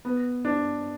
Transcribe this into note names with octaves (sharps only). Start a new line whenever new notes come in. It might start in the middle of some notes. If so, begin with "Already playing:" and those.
B3
D4